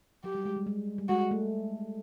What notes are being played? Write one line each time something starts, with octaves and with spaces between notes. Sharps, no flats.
F#3 G4
G3
G#3
G3
G#3
G3
G#3 F#4
A3